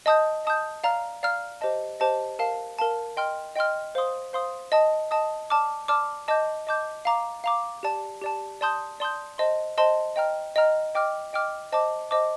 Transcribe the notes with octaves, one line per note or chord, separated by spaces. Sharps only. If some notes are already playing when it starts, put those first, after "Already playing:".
D#5 A5 D#6 G6
D#5 A5 D#6 G6
D5 F5 A#5 F6
D5 F5 A#5 F6
G4 C5 D#5 A5
G4 C5 D#5 A5
A#4 F5 A5
A#4 F5 A5
D#5 G5 C6 F6
D#5 G5 C6 F6
C5 F5 C6 D#6
C5 F5 C6 D#6
D#5 A5 D#6
D#5 A5 D#6
D5 A5 D6 F6
D5 A5 D6 F6
D#5 A5 D6 G6
D#5 A5 D6 G6
F5 A#5 D6
F5 A#5 D6
G4 D5 A5
G4 D5 A5
D5 A5 C6 D#6 G6
D5 A5 C6 D#6 G6
C5 D#5 A5 C6
C5 D#5 A5 C6
D#5 G5 A#5 F6
D#5 G5 A#5 F6
D#5 G5 D6 F6
D#5 G5 D6 F6
C5 D#5 A5 D6
C5 D#5 A5 D6